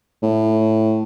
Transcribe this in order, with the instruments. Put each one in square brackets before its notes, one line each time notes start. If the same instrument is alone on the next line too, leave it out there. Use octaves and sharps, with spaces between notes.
[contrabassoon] A2